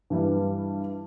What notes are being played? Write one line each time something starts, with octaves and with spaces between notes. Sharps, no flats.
G2 E3 G3